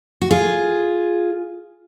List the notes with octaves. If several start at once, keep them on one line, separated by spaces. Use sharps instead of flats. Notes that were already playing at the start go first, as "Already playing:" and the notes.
F#4
F4 G#4